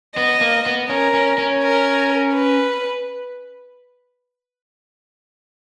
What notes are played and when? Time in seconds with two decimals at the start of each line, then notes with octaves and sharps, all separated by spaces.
0.17 B3 D#5
0.41 A#3
0.66 B3
0.90 C#4 A#4
1.14 C#4
1.38 C#4
1.63 A#4
2.35 B4